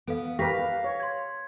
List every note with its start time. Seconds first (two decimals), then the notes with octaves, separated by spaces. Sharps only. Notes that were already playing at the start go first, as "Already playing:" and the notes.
0.08 B3 A4 F5
0.39 G4 A#4 B4 F5 A#6 B6
0.84 C#5
1.00 C6 G#6